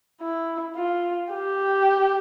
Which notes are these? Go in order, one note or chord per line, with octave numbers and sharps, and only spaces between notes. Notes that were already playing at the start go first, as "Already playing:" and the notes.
E4
F4
G4